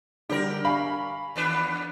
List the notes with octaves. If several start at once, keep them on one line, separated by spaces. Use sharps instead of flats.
D3 G3 G4 A#4
F5 G#5 B5 C#6
D#2 D4 B4